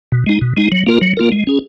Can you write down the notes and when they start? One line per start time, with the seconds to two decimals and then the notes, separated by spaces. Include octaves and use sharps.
0.12 B2
0.26 G#3 D#4
0.41 B2
0.57 G#3 D#4
0.72 F#3
0.87 A#3 F4 A#4
1.01 F#3
1.17 A#3 F4 A#4
1.32 G#3
1.47 C#4 G#4